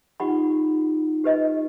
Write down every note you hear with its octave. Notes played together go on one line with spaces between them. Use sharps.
D#4 F4 G4 F#5 B5
G4 B4 D#5